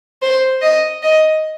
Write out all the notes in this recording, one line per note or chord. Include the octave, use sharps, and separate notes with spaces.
C5
D#5
D#5